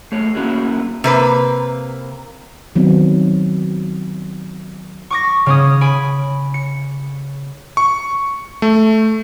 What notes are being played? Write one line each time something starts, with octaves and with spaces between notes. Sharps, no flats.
A3 G#4 C#5
A#3 B3 C#4 E4 F#4 G#4
C3 A#3 B4
D#3 F#3 B3 C4
C#6 D6 A#6
C#3 C#4 D#6
G#5 B5 D7
C#7
C#6
A3